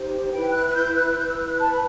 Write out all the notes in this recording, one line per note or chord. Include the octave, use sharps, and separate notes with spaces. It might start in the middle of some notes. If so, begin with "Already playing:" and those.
Already playing: D#4 G4 C5
E4 B4 G5
F#6
F#6
G6
F#6
E4 B4 G6
E6
F#6
F#6
A5
B5